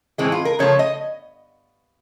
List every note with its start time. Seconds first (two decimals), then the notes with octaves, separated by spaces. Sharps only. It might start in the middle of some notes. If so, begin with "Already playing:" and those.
0.18 A2 E3 G#3 C4
0.32 F4
0.45 A#4
0.59 C#3 F3 A3 C#5
0.79 D#5